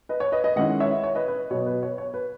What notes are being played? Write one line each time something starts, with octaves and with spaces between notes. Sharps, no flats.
B4 D#5
C#5
B4 D#5
B4 D#5
D#3 G#3 C#4 E4 D#5 F#5
C#5 E5
C#5
B4 D#5
B4
B2 F#3 B3 C#5
B4
C#5
C#5
B4